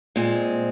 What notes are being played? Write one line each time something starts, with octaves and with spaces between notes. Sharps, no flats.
A#2 G#3 C4